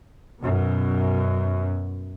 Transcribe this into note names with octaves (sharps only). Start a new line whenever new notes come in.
F#2 B2